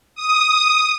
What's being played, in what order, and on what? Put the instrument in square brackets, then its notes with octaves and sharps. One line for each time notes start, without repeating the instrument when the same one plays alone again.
[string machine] D#6